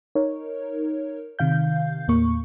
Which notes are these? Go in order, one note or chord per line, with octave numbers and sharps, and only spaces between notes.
D#4 A#4 C#5
C3 D#3 F5 G6
D#2 A2 A#3 C#6